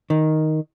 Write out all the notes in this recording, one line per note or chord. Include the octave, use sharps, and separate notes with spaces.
D#3